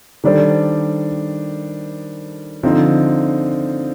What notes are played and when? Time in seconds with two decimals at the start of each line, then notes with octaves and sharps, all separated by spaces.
0.24 D#3 G3 D4 A4 C5
2.63 D3 F3 C4 D#4